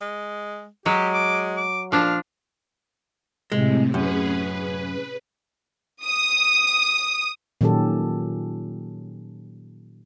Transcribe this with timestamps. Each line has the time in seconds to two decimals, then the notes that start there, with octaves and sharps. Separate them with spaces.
0.01 G#3
0.86 F#3 G#3 G4
1.13 D6
1.57 D6
1.92 A#2 F3 D4 F5
3.52 A2 C3 G#3
3.94 F#2 C#4 G#4 B4
4.30 B4
6.04 D#6
7.61 A#2 D#3 F#3 C#4 G4 A4